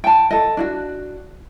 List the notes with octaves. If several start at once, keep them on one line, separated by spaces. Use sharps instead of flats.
G5 A5
A4 D#5
D4 E4 F#4